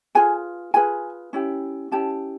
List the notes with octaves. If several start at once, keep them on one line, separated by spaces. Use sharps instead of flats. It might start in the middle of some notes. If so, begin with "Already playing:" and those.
F4 G#4 B4 G#5
F4 G#4 B4 G#5
C#4 E4 G4
C#4 E4 G4 A5